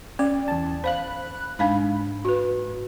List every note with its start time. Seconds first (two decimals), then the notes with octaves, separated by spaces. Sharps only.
0.19 C#4 D5
0.48 E2 A5
0.84 C5 F5 B5 F#6
1.59 G#2 D4 F5 B5
2.25 F#4 B4